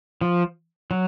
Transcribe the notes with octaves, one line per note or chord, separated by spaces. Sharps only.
F3
F#3